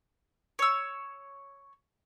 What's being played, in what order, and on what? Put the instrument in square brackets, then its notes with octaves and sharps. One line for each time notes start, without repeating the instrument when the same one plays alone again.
[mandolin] C#5 E6